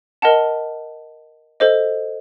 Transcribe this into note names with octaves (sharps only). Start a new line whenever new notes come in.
A#4 D#5 F#5 A5
A4 C5 D#5